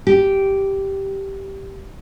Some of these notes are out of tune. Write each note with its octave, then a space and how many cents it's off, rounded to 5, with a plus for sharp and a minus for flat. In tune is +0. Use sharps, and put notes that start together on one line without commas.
G4 -10